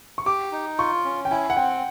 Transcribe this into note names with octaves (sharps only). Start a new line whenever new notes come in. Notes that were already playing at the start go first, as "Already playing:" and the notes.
C#6
G4 D6
D#4
F4 C#6
C#4
G5
E4 G#5
F#5
C4 G5